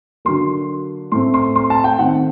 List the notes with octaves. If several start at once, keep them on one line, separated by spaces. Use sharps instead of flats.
D3 F#3 A#3 C6
A2 A3 C4 C6
C6
C6
A5
G5
D#3 A3 C4 F#5